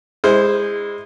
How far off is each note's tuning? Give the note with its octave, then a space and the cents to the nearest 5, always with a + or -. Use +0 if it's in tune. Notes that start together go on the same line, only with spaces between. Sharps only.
G#3 -20 E4 -15 C5 +0